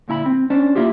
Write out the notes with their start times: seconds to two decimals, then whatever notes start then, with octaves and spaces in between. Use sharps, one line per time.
0.08 D2 A#2 E4 A#5 B5
0.26 C4
0.50 C#4 D4 C5 D5
0.75 A#3 E4 F4 G4